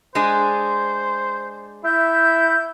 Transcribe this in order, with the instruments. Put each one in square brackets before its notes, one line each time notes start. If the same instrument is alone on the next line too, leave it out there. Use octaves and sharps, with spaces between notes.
[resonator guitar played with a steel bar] G#3 D4 G#4 [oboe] C5
[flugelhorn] E4 [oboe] E5 [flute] G6